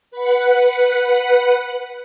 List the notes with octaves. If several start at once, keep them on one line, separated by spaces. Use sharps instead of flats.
B4 F#5